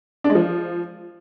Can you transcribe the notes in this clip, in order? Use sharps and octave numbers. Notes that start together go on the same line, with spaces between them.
D4
G#3
F3